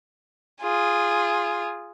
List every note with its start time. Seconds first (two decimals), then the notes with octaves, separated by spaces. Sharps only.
0.61 F4 G#4